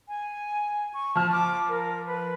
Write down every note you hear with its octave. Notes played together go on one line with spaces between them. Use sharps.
G#5
C#6
F3 A5 F6
D6
A#4
B4